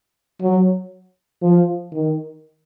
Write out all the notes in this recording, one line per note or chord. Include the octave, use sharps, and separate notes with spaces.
F#3
F3
D#3